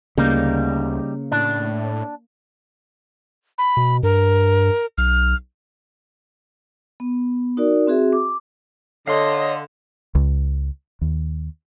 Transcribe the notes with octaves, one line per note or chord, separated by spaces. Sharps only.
D2 C#3 G3 A#3 D#4
A2 D4
B5
B2
G2 A#4
B1 F6
B3
D#4 F#4 A#4 D5
C4 F#4 G#4 E5
D6
D3 C#5 D#5 F5 C6
C#2
D#2